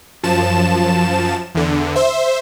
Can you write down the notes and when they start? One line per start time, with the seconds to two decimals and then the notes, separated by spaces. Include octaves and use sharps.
0.23 F#2 F3 A5 E7
1.55 E2 D3
1.95 C5 E5